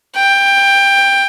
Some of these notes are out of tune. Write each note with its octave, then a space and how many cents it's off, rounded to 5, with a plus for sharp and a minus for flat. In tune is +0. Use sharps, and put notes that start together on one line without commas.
G5 +15